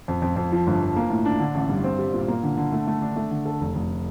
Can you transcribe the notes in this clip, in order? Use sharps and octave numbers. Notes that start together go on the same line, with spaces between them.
F2
F2
F2
F3
G1
F3
A#3
A2
D4
D3
A1
G2
C4
G3
A#2
A#3
D3
D3
A3
A3
D4
A3
D3
A4
F1
F1